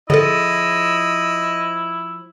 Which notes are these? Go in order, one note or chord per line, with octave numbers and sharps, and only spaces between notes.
D3 F3 E4 G#4 A4 D#5